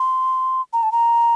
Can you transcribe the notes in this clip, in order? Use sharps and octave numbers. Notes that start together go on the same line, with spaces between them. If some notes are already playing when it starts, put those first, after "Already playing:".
Already playing: C6
A#5
A5
A#5